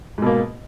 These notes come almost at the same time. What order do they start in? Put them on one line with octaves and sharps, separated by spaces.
G#2 B2 A#3